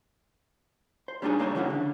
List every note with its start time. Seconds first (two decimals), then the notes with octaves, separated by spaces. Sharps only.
1.08 C5
1.22 G3 A#3 D4 D#4 G#4 C#5
1.39 G2 A#3 D4 A#4 C5 C#5
1.55 C#3 E3 F#3 C#4 E4 F#5
1.70 D3